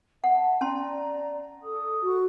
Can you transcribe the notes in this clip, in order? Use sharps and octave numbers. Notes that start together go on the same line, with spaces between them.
E5 F#5 A5
C#4 D5 A5 A#5 C6
A4 D#6
F#4